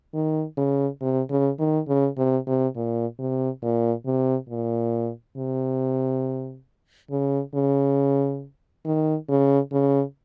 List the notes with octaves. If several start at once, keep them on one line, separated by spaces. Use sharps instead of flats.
D#3
C#3
C3
C#3
D#3
C#3
C3
C3
A#2
C3
A#2
C3
A#2
C3
C#3
C#3
D#3
C#3
C#3